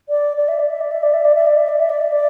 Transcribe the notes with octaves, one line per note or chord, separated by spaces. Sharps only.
D5
D5
E5
D5
E5
D5
E5
D5
E5
D5
E5
D5
E5
D5
E5
D5
E5
D5